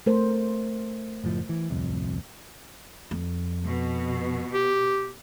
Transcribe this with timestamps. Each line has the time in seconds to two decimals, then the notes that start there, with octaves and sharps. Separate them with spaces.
0.06 A3 A#4 C5
1.24 F#1 A2 F3
1.49 E3
1.70 D1 C2 F2
3.11 F2
3.65 B2
4.53 G4